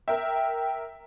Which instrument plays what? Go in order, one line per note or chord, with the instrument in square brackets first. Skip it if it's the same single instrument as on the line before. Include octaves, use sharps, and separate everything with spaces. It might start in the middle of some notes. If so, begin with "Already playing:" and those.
[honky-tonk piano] A#4 E5 [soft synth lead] G5